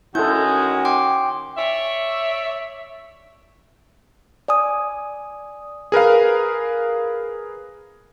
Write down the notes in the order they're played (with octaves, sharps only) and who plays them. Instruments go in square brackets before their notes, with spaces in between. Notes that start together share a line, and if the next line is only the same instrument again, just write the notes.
[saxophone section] D#3 C#4 F#4 [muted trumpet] G#3 [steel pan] E4 A4 [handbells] G6
[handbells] G5 C6 D6
[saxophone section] C#5 D5 E5
[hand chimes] D5 G#5 D#6
[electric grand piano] G#4 A#4 B4 F5